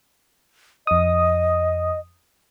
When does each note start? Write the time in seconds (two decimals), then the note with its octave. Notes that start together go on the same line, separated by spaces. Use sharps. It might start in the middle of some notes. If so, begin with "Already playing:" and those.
0.87 F2 D#5 D#6